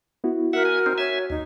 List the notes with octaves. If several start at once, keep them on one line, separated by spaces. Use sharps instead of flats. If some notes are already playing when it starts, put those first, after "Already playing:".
B3 E4 F#4
F#4 A#4 E5 F#5 F#6
G#5
C4 D#4
C#5 E5 G#5
D#2 D#4